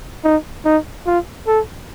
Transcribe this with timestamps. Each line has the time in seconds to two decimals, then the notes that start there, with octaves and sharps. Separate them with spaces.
0.24 D#4
0.65 D#4
1.06 F4
1.47 A4